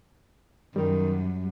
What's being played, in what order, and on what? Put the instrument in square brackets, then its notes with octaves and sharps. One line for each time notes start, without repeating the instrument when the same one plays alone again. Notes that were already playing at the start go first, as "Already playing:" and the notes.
[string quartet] F#2 [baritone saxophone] D#3 [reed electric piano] G3